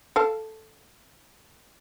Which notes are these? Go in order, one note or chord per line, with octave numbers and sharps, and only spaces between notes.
A4 F5 A5